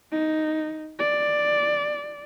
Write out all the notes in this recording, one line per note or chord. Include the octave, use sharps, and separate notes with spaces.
D#4
D5